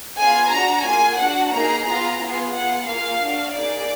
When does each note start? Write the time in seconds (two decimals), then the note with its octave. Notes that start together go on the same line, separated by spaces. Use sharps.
0.19 B3 F4 G#4 G#5
0.52 D4 F#4 A#5
0.86 A#3 F4 G#4 G#5
1.20 D4 F#4 F#5
1.53 A#3 D#4 G#4 A#5
1.86 B3 F4 G#4 A#5
2.20 B3 F4 G#4
2.53 B3 F4 G#4 F#5
2.86 A#3 F4 G#4 F5
3.20 D4 F#4
3.54 A#3 D#4 G#4 D5